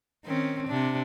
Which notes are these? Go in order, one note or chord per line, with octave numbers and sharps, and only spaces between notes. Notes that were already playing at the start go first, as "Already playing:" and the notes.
D#3 C4 C#4
C3 D4